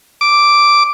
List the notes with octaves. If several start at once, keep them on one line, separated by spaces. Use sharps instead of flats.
D6